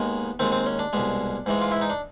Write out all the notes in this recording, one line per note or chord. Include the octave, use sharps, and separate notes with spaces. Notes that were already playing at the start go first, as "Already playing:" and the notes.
Already playing: D#2 D#3 G#3 B3
D#2 D#3 G#3 C4
C4
C#4
D4
C2 B2 G#3
G#2 E3 G#3
F4
E4
D#4
D4